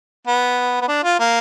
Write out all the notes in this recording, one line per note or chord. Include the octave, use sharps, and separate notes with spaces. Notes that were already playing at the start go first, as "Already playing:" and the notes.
B3
B3
D4
F4
A#3